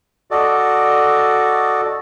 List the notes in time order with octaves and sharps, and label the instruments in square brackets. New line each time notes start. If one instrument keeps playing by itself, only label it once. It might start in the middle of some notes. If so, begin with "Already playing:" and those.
[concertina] F#4 A4 D5 D#5